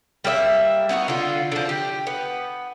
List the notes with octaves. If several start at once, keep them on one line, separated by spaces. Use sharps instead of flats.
G3 A#3 D5 E5
B3 D#4 F4 F#4
D3 F4
D3 F3
G4
B3